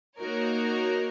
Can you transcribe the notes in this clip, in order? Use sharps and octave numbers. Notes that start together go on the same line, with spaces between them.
A#3 D#4 F#4 A#4 C#5